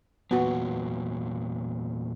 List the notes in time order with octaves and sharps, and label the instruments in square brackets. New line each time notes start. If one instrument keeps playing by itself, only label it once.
[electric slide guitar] E2 A#2 F#3 [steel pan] B3 F#4